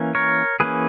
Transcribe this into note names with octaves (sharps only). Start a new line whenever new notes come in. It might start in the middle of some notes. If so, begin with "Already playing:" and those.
Already playing: E3 A#3 C#4
A#4 C#5
E3 A#3 C#4 G#4 B4